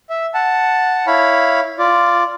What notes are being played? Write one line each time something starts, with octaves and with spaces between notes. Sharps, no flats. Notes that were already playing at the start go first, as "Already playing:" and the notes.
E5
F#5 A5
E4 C#5 F5 B5
F4 D5